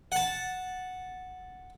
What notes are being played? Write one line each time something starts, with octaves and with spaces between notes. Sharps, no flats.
F#5 A5